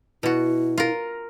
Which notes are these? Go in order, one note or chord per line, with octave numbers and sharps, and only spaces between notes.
B2 E4 F#4
F4 A#4